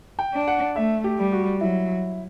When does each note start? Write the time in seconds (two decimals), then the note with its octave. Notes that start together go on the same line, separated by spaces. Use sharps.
0.19 G5
0.33 D4
0.48 F#5
0.76 A3 E5
1.04 G4
1.18 G3
1.32 F#4
1.61 F#3 E4